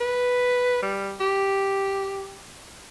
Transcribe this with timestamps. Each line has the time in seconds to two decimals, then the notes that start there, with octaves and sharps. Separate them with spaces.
0.01 B4
0.83 G3
1.21 G4